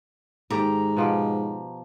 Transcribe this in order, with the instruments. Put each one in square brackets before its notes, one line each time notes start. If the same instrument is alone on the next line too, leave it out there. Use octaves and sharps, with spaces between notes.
[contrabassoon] G#2 [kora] D#3 G4 A4 [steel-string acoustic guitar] A#5
[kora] B2 F3 G4